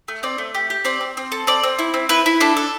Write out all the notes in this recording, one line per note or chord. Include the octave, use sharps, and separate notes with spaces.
A3
C4 D5
A3
G4
G4
C4 D5
C4
C4
A4
C4 D5
C4
E4
C4
E4 B4
E4
D4 A4
A4